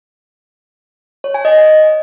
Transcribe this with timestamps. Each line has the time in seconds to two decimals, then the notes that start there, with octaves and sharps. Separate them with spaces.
1.24 C#5
1.34 G#5
1.45 D#5